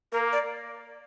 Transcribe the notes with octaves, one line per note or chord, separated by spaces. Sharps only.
A#3 A#4
D5